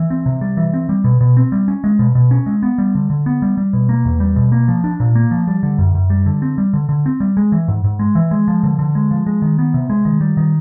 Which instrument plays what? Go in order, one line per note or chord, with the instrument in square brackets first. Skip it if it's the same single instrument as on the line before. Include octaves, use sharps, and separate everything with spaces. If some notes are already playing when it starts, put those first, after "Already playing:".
Already playing: [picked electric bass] E3
C4
C3
G3
E3
C4
G3
B2
B2
C4
G3
C#4
G#3
B2
B2
C#4
G#3
B3
G3
D3
D3
B3
G3
G3
B2
A#3
E2
G3
B2
A#3
F3
D4
A#2
A#3
F3
G3
D3
F#2
F#2
G3
D3
C4
G3
D3
D3
C4
G3
G#3
E3
G#2
G#2
G#3
E3
G#3
F3
D3
D3
G#3
F3
G#3
D#3
B3
C3
G#3
D#3
G3
D#3